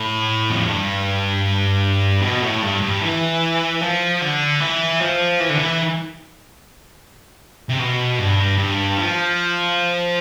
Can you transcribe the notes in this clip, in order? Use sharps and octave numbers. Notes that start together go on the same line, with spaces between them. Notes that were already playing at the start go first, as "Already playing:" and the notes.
Already playing: A2
F2
G2
B2
A2
G2
G2
E3
F3
D3
E3
F3
E3
D3
E3
C3
B2
G2
G2
F3